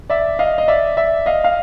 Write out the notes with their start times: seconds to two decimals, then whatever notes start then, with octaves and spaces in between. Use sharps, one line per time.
0.10 D5 E5
0.39 D#5 F5
0.58 D#5
0.68 D5 E5
0.97 D5 E5
1.26 D#5 F5
1.44 F5